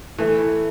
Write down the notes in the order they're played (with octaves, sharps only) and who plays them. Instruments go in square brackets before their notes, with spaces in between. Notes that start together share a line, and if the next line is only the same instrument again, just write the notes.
[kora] E3 [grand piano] A3